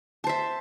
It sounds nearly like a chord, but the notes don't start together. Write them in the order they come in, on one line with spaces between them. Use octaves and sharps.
A5 C5 E5